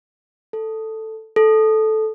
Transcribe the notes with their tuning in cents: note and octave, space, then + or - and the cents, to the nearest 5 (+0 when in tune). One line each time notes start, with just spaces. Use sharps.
A4 +5
A4 -10